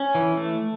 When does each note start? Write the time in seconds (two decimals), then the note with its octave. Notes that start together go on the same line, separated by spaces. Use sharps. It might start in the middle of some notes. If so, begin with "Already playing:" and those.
Already playing: C#4
0.15 E3
0.37 A3